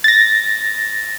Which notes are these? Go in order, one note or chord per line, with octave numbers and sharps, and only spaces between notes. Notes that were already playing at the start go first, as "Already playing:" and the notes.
A6 A#6